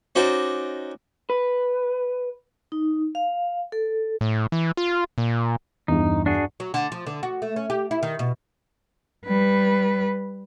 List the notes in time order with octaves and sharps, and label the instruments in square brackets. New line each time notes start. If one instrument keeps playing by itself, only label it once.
[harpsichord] C#4 D#4 F#4 C5 D5
[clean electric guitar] B4
[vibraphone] D#4
F5
A4
[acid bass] A2
E3
F4
A#2
[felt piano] E2 G2 [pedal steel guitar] D#4
[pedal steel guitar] D4 F#4 G#4
[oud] F#3
D3
F3
D3
F#4
A3
C#4
G4
E4
D#3
B2
[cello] G3 B4